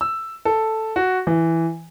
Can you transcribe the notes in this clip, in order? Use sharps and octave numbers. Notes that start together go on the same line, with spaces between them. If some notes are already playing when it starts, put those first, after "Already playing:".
E6
A4
F#4
E3